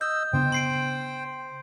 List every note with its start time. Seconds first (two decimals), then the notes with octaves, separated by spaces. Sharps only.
0.01 D#5 E6 G6
0.33 C#3 B3 D4 C5 G5
0.52 C6 C7 D7